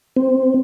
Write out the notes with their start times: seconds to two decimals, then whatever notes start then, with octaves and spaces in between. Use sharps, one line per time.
0.17 C4